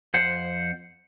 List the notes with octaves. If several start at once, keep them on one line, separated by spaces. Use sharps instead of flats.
F2 C5 F#5